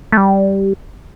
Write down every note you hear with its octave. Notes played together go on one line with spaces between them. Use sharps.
A3
G3